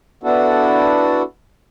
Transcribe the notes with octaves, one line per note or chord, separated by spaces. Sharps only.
B3 D4 E4 F#4 A4